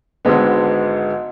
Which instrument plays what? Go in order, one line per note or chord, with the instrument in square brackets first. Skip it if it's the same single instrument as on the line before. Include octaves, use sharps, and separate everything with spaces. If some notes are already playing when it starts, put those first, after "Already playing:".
[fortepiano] G#1 G#2 D3 G#3 B3